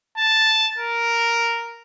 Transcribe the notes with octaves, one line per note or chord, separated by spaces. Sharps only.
A5
A#4